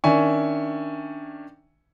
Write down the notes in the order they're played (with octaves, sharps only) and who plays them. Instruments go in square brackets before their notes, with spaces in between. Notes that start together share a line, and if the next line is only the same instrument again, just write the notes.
[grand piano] D#3 C#4 D4 E5 G#5 C#6